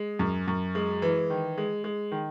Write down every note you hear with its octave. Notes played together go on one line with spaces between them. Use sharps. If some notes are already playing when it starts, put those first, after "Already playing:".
Already playing: G#3
F#2
F#2
G#3
E3
D#3
G#3
G#3
D#3